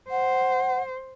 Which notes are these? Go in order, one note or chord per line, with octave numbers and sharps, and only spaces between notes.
C5 F#5